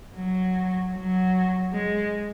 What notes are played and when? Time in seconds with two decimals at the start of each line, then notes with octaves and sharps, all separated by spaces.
0.16 F#3
0.95 F#3
1.73 G#3